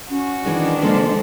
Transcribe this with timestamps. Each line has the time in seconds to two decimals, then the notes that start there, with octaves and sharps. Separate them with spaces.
0.10 C#4 F#4
0.44 D#3 E3 G#3 D4 D#4
0.82 C#3 F3 G#3 A#3 A4 C5